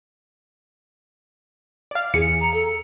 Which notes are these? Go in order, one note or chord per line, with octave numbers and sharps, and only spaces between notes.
D5 F5
E2 G#4 C#7
A#5
A4